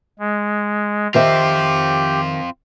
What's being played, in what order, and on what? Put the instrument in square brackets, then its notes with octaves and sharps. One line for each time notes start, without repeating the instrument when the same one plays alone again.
[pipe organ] G#3
[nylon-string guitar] D#3 C5 E5 [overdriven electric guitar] C4 F4 [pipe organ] G4